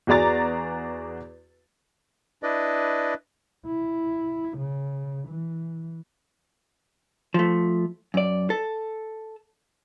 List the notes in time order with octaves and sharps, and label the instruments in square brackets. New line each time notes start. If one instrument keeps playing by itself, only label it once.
[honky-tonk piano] E2 F#4 G#4 D5 A#5 A6
[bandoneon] D4 E4 B4 D5 D#5
[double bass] E4
C#3
E3
[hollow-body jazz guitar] F3 A3
F#2 D5
A4